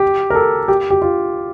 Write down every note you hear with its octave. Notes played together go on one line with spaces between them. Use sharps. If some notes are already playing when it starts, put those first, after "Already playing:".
Already playing: G4
A#4
A4
G4
G4
F4